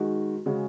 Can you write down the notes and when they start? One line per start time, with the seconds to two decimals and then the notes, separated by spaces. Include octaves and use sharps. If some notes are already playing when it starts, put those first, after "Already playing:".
Already playing: D#3 G#3 F#4
0.46 C#3 G#3 F#4